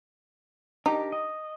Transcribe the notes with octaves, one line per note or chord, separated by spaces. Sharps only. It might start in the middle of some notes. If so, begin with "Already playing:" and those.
D4 D#4 G4 A#4
D#5